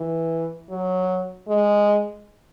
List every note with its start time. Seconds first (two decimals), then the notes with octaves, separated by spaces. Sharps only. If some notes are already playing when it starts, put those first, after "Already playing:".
Already playing: E3
0.70 F#3
1.48 G#3